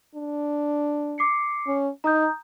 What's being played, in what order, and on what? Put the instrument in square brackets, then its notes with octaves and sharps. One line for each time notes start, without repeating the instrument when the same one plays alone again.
[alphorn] D4
[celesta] D6 C7 C#7
[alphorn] C#4
[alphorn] D#4 [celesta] A#5 D#6 G6